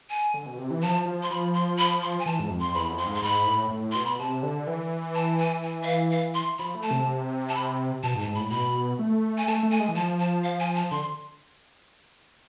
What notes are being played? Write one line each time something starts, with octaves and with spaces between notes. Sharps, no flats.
G#5
D3
B2
C3
E3
F3 A5
F3
C6
F3 B5
C6
B5
C6
G#5
E3 A5
G#2
F2
C6
E2 B5
F2
C6
G#2
C6
G#2 B5
A2
A2
B2 C6
B5
C3 A5
D3
E3
A5
G#5
G#5
E5
F5
F5
C6
F3 B5
A3
A5
C3
A5
B5
B2 A5
G#2
A5
G#2
B5
A2
B2 B5
A3
G#5
A3 A5
A3
G#5
G#3
E3
F3 A5
A5
F5
G#5
A5
D3 C6